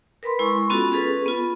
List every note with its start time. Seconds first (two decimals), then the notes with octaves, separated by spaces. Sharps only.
0.23 A#4 B4 B5 C6
0.39 G#3 E4 C6 C#6
0.70 B3 C#4 F4 F#4 A4
0.92 C#4 G#4 A4 B4
1.26 B3 F4